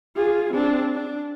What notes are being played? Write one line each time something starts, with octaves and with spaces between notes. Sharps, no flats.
F4 G#4
C4 D4
D4